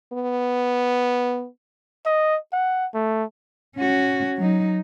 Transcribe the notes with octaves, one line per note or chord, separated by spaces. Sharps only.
B3
D#5
F#5
A3
C#4 F#4
F#3 D#4